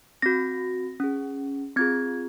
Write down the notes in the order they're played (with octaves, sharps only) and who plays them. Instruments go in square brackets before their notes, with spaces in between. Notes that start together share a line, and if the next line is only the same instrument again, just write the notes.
[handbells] C4 F#4 A#6
C#4 G#4
C4 F4 G#4 G#6